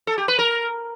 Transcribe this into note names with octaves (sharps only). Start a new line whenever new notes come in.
A4
G4
B4
A#4